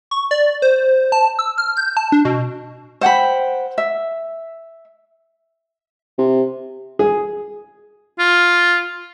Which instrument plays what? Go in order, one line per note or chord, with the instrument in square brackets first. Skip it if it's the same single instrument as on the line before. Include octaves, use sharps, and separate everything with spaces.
[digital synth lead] C#6
D5
C5
A5
E6
F6
G6
A5
D4
B2
[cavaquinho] C5 F#5 G5 B5
E5
[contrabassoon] C3
[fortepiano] G#4
[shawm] F4